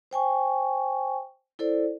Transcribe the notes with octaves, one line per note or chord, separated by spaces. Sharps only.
C5 G5 G#5 C#6
E4 A4 C5 D5